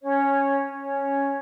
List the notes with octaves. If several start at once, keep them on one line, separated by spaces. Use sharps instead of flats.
C#4 C#5
C#4 C#5